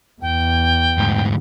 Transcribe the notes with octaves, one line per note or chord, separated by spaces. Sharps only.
E2 G5
D2 G#2